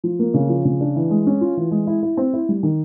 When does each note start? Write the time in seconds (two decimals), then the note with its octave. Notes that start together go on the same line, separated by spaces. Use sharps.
0.04 F3
0.19 A#3
0.34 C#3
0.49 F3
0.65 C#3
0.81 D4
0.96 E3
1.10 G#3
1.27 C#4
1.41 F4
1.57 E3
1.71 G#3
1.87 E4
2.03 E4
2.17 C4
2.33 E4
2.49 G3
2.63 D#3